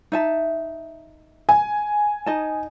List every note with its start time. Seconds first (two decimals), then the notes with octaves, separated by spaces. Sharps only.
0.12 D#4 E5 A5
1.49 G#5
2.26 D#4 D#5 A5